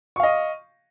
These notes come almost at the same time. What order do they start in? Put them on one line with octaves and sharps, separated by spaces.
C#6 F5 D#5